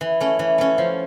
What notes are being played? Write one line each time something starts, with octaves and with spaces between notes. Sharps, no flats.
E3
A3 C#4
E3
A3 C#4
F3